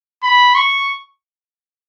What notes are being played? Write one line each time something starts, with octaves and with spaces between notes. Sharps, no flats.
B5
C#6